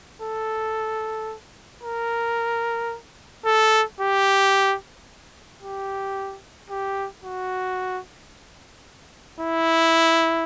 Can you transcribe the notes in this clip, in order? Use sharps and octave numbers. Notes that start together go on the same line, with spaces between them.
A4
A#4
A4
G4
G4
G4
F#4
E4